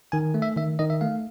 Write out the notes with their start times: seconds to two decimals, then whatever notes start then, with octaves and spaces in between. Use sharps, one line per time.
0.12 D#3 G#5
0.34 A3
0.42 E5
0.57 D#3 E5
0.79 D#3 D#5
0.90 E5
1.01 A3 F5